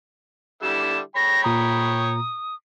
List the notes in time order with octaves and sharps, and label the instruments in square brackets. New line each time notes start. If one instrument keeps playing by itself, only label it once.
[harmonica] D3 G3 E4 [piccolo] E7
[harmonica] C#5 G5 B5 [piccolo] A#6
[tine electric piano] A#2 A#5 [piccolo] D#6